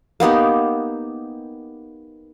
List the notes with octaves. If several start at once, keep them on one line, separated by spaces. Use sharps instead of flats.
A#3 B3 D#4 G4